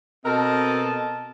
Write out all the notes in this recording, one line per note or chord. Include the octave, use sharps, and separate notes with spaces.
B2 C4 A4 A#4 D#5 A5